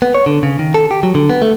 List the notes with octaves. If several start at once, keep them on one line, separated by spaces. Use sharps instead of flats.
B3
C#5
D3
C#3
D#3
A4
G4
F#3
D3
B3
A3